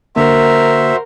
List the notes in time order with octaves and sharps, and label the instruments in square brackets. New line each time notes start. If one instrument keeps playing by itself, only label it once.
[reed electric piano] D3 A#3 [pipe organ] F#4 C5 [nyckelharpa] A#4 [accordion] E5